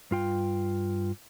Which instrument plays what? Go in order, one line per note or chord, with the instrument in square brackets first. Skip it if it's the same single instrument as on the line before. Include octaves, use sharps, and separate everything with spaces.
[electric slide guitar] G2 F4 G5